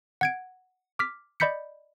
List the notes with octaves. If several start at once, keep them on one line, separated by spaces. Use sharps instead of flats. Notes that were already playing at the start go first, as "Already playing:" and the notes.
F#5 G#6 D7
D6 F6 B6
D5 D#5 B5 G6 B6 C#7